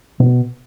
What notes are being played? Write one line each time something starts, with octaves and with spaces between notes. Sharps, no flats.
B2